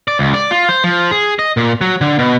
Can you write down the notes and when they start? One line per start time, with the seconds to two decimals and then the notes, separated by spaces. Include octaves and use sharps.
0.08 D5
0.19 C#2
0.34 D5
0.51 F4
0.69 C5
0.84 F3
1.11 G#4
1.39 D#5
1.57 A#2
1.81 F#3
2.01 D3
2.19 B2